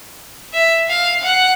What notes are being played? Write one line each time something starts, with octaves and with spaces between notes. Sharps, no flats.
E5
F5
F#5